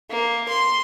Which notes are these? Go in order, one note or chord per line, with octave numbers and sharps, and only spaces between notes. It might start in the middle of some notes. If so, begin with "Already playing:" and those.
A#3
C6